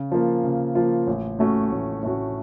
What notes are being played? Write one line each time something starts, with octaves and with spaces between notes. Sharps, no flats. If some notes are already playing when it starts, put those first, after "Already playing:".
Already playing: C#3
F3 A#3 F4
C#3
F3 A#3 F4
A1
A2 A3 C#4 F#4
A1
A2 A3 C#4 F#4